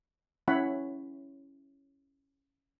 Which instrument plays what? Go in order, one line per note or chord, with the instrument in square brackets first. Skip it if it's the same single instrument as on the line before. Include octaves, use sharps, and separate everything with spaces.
[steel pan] C#4 E4 C#5 F#5 B5